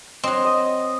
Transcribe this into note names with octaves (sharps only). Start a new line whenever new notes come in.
F#3 C4 D#5
D#5